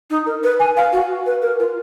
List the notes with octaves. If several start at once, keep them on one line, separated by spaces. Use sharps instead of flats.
D#4
A#4
B4
G#5
F5
F#4
B4
A#4
F4